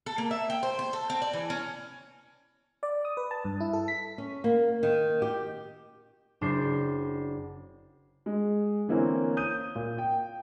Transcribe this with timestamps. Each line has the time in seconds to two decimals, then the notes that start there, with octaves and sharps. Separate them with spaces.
0.06 A4
0.18 A#3
0.31 E5
0.50 G5
0.63 C5
0.79 C5
0.93 A4
1.10 C4
1.22 D5
1.33 E3
1.50 C#4
2.83 D5
3.05 D#6
3.17 B4
3.31 A5
3.45 G2
3.60 E4
3.73 A4
3.88 B6
4.18 C#4
4.44 A#3
4.83 D#3
5.22 G4
6.41 F#1 D4 C5 G6 C7
8.26 G#3
8.88 D3 E3 A#3 C4 C#4
9.37 D#6 G6 D#7
9.75 A#2
9.98 G5